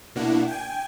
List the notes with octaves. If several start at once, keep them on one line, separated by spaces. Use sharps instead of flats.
B2 A#3 D4 E4 F#5
G5 G#5